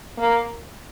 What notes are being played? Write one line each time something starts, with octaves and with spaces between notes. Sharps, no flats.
A#3